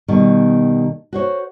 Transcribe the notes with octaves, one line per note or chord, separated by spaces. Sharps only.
B2 D#3 G3
F#4 C5 C#5